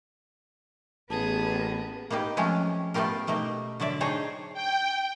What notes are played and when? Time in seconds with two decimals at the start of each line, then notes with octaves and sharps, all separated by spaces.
1.10 A1 B3 G#4 A5
2.10 A#3 B3 D#4 G4
2.37 F3 F#3 G#3 A3 C4 C#4
2.94 A3 B3 F4 G4 A#4
3.27 B2 A3 A#3 D#4
3.80 D3 F#3 D5 E5
4.00 D4 D#4 G#4 C5 C#5
4.54 G5